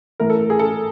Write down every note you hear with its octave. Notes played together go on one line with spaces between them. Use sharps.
A2 E3 A3 A#4
A4
G#4
A4